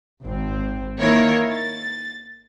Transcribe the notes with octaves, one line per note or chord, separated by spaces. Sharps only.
G#1 C4
D#3 A#3 E4 A#4 C#5
A6